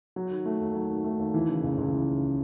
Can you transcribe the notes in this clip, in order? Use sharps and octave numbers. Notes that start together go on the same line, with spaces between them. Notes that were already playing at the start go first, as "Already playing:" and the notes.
F#3
D#3
A3
D#2
F#3
D#3
A3
D#2
E3
C#3
C#2
C#2
E3
C#3